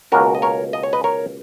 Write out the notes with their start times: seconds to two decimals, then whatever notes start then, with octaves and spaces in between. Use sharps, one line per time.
0.12 C#2 B2 A#3 C#4 F#4 A#4
0.35 D#5
0.42 A#4 C#5
0.73 D#5
0.83 C#5
0.93 B4 D#5
1.04 A#4 C#5